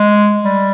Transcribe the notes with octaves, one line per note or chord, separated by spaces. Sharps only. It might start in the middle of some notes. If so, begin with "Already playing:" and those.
Already playing: G#3
G3